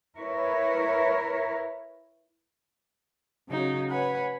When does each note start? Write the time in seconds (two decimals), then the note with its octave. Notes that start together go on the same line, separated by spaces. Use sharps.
0.17 E4 A#4 B4 C#5
3.48 C#3 F#3 D#4
3.89 B4 C#5 F#5 G#5 B5